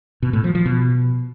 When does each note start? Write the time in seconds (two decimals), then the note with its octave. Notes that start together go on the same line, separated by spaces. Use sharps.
0.22 B2
0.33 A2
0.44 F3
0.55 F3
0.66 B2